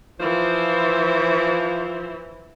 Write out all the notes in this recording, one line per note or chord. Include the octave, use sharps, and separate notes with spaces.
E3 F3 C5